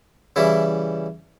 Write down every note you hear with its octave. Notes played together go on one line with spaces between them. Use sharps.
C#3 E3 G3 E4